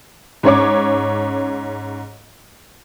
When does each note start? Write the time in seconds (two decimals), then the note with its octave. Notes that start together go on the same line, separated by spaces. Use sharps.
0.43 G#2 C#4 C#5 D6